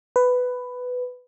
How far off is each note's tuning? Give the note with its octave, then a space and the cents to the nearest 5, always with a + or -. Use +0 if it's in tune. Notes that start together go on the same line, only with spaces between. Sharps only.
B4 +10